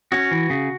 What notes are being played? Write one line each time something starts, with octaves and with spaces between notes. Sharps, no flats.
C#4 F#4
E3
C#3